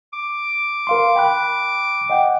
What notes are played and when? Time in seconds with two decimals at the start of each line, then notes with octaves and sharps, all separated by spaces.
0.13 D6
0.87 A#4 F5 C6
1.16 G5 B5 F#6
2.10 D#5 F#5 G5